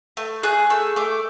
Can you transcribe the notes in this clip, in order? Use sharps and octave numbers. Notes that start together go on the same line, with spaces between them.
A3
G#4 F#6
A3 E6
A3 D6